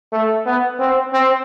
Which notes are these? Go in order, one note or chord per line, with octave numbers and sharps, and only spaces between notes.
A3
B3
C4
C4